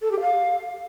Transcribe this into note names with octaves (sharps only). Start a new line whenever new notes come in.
A4
G4
F5